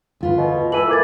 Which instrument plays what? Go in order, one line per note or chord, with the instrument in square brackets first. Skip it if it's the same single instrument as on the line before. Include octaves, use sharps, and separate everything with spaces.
[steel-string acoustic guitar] D2 F4 B4
[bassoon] B2
[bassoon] E3 [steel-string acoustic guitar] A4 [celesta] E6 D#7 F#7
[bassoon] A#3 [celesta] D6 G#6 A6